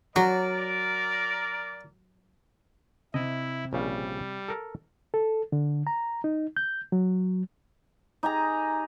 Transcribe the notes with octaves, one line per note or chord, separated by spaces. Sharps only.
F#3 F#4 A#4 D5
C3 E4 D#5
A#1 C#3 G3 F5
A4 A#4
A4
D3
A#5
D#4
G6
F#3
D#4 G4 G#4 A#5